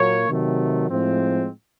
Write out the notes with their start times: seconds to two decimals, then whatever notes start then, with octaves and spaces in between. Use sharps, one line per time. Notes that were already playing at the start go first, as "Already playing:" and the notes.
Already playing: A#2 F#3 A#3 C#5
0.29 C3 D#3 F#3 A3
0.89 A2 F3 G#3 C4